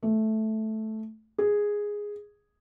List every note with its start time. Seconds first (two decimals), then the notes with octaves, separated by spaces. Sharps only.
0.03 A3
1.38 G#4